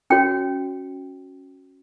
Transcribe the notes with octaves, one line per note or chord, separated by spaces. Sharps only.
C#4 F#4 C#5 G5